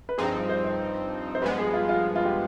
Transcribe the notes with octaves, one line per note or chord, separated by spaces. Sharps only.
B4
G2 F3 C4 D#4 G#4
C5
C5
C5
G2 F3 G#3 B3 B4
G#4
F4
F4
F4
G4